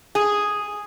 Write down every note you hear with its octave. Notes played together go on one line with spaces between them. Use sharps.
G#4